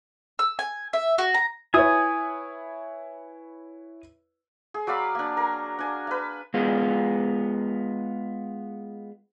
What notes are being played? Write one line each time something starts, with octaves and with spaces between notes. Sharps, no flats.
E6
G#5
E5
F#4
A#5
E4 B4 C#5 G#5 D#6
G#4
F#3 D5 F5 B5
A#3 D4
A#4
D4 G#5
B4 F5
G#3 B3 F4